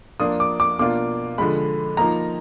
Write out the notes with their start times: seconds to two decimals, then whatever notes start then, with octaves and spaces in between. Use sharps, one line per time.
0.19 F3 A#3 D4 F4 D#6
0.40 D6
0.60 D6
0.79 B2 A#3 D4 F4 D6
1.38 D3 F3 G#3 B5
1.97 F3 A#3 D#4 A#5